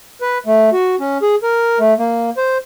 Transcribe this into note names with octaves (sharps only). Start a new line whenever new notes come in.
B4
A3
F#4
C#4
G#4
A#4
A3
A#3
C5